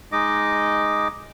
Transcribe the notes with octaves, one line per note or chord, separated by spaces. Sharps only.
G#3 D#4 D#5 D6